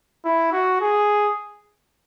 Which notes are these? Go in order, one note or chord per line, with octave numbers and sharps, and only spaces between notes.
E4
F#4
G#4